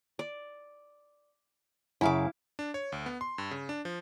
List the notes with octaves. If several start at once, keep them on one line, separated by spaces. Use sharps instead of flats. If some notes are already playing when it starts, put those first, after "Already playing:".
D5
F#2 C#3 E4 F5 D6
D4
C#5
D2
B3
C6
G2
C#3
D4
F3